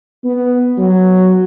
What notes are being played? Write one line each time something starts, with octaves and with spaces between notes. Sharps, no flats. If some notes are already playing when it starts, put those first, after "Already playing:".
B3
F#3